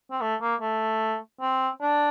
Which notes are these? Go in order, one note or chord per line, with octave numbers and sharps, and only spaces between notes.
C4
A3
A#3
A3
C4
D4